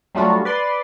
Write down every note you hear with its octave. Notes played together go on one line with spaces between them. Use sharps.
F#3 G3 A3 D4 F4 F#4
B4 D5 C6